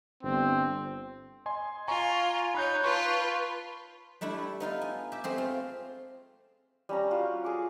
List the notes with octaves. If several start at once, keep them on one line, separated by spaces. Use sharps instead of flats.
G1 C4
D#5 G#5 C6
F4 G#5 A#5 C#6
D#4 C#5 B5 F#6 G6
F4 B4 A5 C6 C#6
G3 A3 D4 E4
B3 D#4 F4 A4
G#5
G4 E5
A3 C4 G#4
F4
G3 C#4 A#5
F4 F#4
G#4 C#6 D6